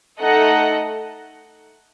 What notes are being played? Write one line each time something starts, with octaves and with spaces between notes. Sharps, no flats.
A3 D#4 A4 D#5 F#5